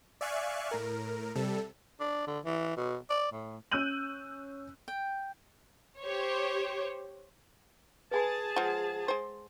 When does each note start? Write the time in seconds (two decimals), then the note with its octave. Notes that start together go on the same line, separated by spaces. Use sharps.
0.21 D5 E5 F5 G#5 C#6 F#6
0.71 A2 A#4
1.35 C3 G3 A4
2.00 D4
2.27 D3
2.45 E3
2.77 B2
3.10 D5
3.32 A2
3.72 C#4 E6 F#6 G6 D#7 F#7
4.88 G5
6.00 G4 C5 C#5
8.11 G#4 B4 G#5 A5 B5
8.56 F3 G#3 F#5
9.08 G#3 C5